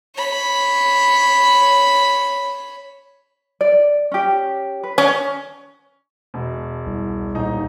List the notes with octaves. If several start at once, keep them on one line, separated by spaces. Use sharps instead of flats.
C#5 B5
D5
C#4 G4
B4
C#4 D4
E1
C2
D#1 D#4 A#5